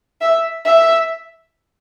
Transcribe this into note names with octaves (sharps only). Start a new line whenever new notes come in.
E5
E5